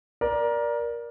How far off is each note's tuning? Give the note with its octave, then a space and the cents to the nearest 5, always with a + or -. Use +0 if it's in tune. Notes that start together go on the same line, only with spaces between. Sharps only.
A#4 +20 D5 +0